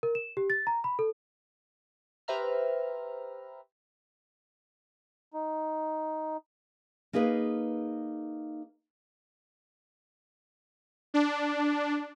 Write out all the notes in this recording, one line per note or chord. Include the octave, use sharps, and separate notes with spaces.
A#4
E7
G4
A6
A#5
B5
A4
G4 B4 C5 E5 A#5 F6
D#4
A#3 D#4 G#4 B4 F5
D4